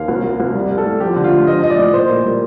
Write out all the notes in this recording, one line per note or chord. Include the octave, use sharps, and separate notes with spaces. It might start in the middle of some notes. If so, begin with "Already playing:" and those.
Already playing: D#2 F5
C2
C2
C2
G3
G3
A4
A2
F3 G4
D3
F4
A3
F3 D#5
F3 D#5
D5
A2
A#2 C5
A#2
G3